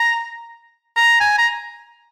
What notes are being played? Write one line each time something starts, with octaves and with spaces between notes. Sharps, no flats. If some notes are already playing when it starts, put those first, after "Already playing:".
Already playing: A#5
A#5
G#5
A#5